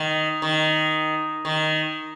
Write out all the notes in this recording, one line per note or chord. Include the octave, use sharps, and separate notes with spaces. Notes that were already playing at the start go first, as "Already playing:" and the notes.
Already playing: D#3
D#3
D#3